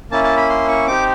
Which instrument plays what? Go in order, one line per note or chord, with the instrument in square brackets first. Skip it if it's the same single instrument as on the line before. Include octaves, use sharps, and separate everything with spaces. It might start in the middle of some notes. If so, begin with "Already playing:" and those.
[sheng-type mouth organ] A#3 C#4 E4 A5
A5
B5
C6
C#6
C4 D#4 G4 D6